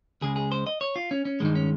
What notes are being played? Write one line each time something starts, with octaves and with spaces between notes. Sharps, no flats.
C#2 C#3 G#3 G#4
G#4
C5
D#5
C#5
F4
C#4
C#4
G2 D#3 G#3 D#4
C#4